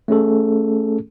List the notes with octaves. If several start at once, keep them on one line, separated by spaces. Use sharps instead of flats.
A3 C#4 G#4 A4